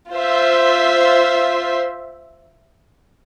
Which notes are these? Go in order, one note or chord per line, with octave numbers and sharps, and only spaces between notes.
F4 C5 E5